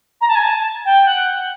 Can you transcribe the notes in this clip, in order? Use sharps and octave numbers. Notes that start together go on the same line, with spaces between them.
A#5
A5
G#5
A5
G5
F#5